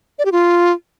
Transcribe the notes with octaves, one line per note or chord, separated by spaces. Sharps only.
D5
G4
F4